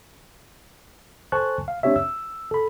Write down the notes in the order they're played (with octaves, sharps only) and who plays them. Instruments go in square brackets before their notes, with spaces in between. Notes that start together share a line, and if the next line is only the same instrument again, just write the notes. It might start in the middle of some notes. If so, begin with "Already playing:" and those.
[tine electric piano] A4 C5 G#5 A5 C#6 F#6
F5
A3 C4 D4 G4 C#5 E5
E6
A4 B5